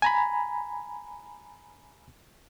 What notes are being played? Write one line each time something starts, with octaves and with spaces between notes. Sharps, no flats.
G#5 A#5 B5